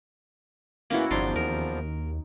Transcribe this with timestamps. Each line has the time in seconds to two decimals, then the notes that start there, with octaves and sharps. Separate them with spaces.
0.91 E2 A#3 C#4 E4 F#4
1.11 G1 E2 F3 D4 D#4 C6
1.36 D#2 A#4